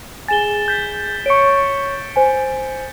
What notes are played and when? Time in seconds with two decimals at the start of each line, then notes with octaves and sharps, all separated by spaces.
0.28 G#4 G#5 A6 E7 G7
0.68 G6 B6
1.26 C#5 C#6 C#7 D7
2.16 C5 G#5